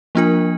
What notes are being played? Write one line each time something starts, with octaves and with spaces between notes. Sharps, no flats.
F3 A#3 D4 F4 A#4